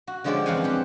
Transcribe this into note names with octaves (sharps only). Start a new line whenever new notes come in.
F#4
D3 F3 G#3 C#4 G4 D5
F2 E3 F5 F#5 G#5
C4 G4